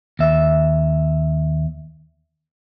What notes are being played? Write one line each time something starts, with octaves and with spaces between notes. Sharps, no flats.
D#2 E5